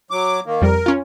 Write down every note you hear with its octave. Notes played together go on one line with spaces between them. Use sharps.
F#3 D6
D#3 A#3
F2 G3 A#4
C#4 F4